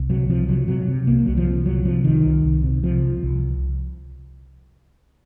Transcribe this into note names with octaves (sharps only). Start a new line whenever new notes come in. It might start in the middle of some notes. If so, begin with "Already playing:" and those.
Already playing: C2
C3 F#3
C3 F3
C3 F#3
C3 F#3
C3
C2 A#3
C2 F#3
F3
C3
C3 F#3
C3 F3
C2 D#3
C2
C2
C3
C3 F3
C2
C2